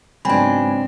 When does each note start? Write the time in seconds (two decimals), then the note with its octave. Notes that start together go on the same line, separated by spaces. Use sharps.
0.25 G#2 C#3 F#3 B3 C4 D4 G#5 B5